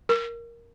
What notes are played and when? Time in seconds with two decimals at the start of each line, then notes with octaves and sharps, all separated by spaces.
0.09 A#4